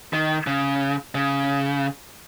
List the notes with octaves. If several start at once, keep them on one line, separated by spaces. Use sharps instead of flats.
D#3
C#3
C#3